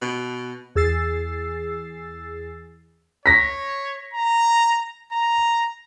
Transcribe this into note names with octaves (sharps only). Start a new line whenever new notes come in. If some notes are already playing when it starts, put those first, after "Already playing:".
B2
E2 G#4 E6 A6 C7
C#5 A#6 B6
A#5
A#5